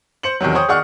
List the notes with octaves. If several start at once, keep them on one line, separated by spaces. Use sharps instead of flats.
C5 C#7 F#7
E2 C3 D#3 F#3
C5 C#5 G5 C#6 D#6
D#3 G#4 D5 F#5 C#6 F6